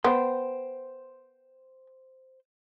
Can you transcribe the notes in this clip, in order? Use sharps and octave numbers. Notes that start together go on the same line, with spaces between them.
B3 C5 G5 C6